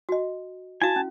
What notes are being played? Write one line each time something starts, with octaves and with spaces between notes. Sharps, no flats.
F#4 D#5
E4 F#4 F5 G#5 A5
C#4